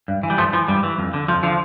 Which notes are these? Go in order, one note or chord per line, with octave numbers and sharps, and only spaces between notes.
G2
E3
G3
G2 F3 A3
E3 F3
G2 G3
E3
F2
D3
F2 F3
D3 F3